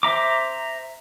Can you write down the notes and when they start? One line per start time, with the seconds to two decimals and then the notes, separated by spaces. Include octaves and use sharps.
0.03 C5 E5 A#5 D6